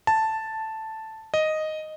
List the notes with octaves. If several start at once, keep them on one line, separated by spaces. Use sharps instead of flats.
A5
D#5